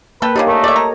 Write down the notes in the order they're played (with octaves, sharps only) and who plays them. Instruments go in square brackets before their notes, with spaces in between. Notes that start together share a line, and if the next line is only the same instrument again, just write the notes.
[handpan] A#3 [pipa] A4 G5 [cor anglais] B4
[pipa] C#3 D4 D#4 [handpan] G4
[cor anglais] A3 [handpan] A#4 D#5
[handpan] A4 C#5 [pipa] D5 E5
[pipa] A#5